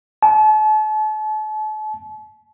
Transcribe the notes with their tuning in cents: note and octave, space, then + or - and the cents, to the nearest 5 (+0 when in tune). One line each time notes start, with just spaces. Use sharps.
A5 -40